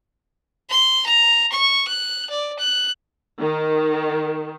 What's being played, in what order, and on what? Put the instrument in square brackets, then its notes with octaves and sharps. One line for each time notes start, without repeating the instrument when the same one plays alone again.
[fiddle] C6
A#5
C#6
F#6
D5
F#6
[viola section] D#3